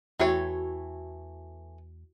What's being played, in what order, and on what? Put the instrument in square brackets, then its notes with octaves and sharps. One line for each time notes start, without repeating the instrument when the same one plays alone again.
[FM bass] E2 [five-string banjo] E3 A3 C#5 [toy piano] E4 F#4 G5